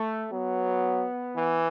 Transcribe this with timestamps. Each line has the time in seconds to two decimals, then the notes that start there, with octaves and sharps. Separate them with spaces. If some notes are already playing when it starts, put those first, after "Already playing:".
Already playing: A3
0.32 F#3 B3
1.36 E3